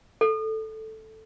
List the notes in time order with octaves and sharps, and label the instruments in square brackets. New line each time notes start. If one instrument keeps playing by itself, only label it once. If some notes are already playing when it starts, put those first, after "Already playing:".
[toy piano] A4